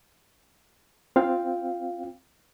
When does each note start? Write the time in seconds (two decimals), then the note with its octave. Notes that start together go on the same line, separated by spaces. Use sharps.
1.16 C4 F4 F5 G5